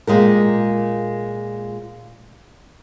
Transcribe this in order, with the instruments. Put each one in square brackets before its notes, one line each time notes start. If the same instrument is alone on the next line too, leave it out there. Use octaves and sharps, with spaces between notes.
[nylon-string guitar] A#2 G#3 G4 A#4